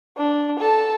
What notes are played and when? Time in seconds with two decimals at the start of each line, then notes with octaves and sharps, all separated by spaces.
0.18 D4
0.60 A4 A5